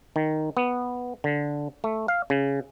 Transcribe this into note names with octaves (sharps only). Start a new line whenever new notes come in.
D#3
B3
D3
A3
F5
C#3